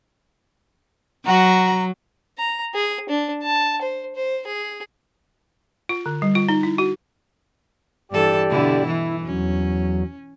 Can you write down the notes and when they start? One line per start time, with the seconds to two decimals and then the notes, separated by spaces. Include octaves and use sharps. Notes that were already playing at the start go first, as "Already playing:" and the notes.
1.26 F#3 F#4 A#5
2.38 A#5
2.75 G#4
3.09 D4
3.43 A5
3.82 C5
4.16 C5
4.47 G#4
5.89 F4
6.06 D3
6.22 G3
6.35 F4
6.49 D#4
6.63 E4
6.78 F#4
8.11 G2 E3 G4 A4 D5
8.49 B2 D3 E4
8.86 E3 E4
9.25 E2 F#3 C#4